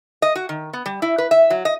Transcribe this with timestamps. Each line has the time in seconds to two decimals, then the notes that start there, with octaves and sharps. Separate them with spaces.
0.22 D#5
0.36 F#4
0.49 D#3
0.73 B3
0.86 G3
1.02 E4
1.18 B4
1.31 E5
1.50 F#3
1.65 D#5